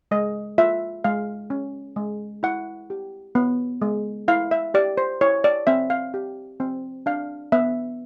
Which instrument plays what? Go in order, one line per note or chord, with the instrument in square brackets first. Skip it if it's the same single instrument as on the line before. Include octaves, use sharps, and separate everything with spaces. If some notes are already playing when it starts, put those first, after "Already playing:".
[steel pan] G#3 D#5
F4 E5
G#3 F5
C#4
G#3
E4 F#5
G4
B3
G#3
E4 F5
E5
G4 D5
C5
E4 C#5
D5
C4 E5
F5
G4
C4
D4 F5
B3 E5